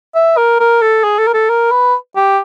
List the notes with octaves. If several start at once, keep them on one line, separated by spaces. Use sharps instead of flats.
E5
A#4
A#4
A4
G#4
A4
A#4
A4
A#4
B4
G4